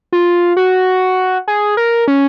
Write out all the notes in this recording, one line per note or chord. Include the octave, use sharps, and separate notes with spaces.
F4
F#4
G#4
A#4
C#4